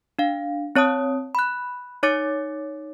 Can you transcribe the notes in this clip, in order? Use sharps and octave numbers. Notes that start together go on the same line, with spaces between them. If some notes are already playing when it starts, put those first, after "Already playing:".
D4 F5
C4 C#5 A5 D#6
B5 F#6
D#4 C#5 D6 A6 C#7